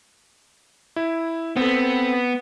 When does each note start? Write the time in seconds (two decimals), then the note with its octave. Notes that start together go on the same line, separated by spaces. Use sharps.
0.96 E4
1.57 B3 C4 A4